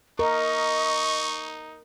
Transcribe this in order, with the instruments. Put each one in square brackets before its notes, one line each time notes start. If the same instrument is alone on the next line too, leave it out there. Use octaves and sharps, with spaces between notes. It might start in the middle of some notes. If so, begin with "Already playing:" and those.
[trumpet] D#4 [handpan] A#4 [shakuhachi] D#5 [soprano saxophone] C#6